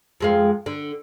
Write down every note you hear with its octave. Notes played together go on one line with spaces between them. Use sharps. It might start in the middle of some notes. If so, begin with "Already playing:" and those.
F2 G#3 F5
D3